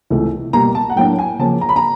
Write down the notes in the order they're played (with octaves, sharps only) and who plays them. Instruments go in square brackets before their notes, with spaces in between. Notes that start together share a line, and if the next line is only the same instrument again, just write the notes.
[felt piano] C#2 C3 E3 A3
[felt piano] B2 G3 A#3 [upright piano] A#5
[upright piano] A5
F#5
[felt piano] A2 F#3 A#3 D4 [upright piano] G5
[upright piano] G#5
[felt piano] C#3 F3 A#3 [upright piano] A5
[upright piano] A#5
B5
A#5